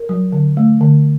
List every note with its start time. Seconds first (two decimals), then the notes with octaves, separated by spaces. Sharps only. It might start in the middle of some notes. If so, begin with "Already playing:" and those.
Already playing: A#4
0.09 F#3
0.32 D3
0.57 A3
0.81 D3